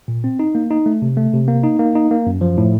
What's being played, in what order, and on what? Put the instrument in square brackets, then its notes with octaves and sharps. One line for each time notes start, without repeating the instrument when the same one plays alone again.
[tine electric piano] A#2
C4
D#4
A#3
D#4
A3
C3
A3
C3
A#3
D#4
A#3
D#4
A#3
F#2
F3
A2